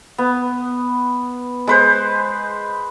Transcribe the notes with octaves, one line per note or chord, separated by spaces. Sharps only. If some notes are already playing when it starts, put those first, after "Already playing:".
B3
G#3 B4 C5